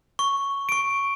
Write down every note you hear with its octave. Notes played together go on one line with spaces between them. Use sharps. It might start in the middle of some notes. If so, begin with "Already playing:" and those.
C#6
C#6 D7